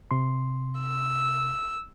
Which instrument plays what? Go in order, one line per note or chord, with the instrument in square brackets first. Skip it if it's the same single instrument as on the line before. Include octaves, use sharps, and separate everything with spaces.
[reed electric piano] C3 C6
[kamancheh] E6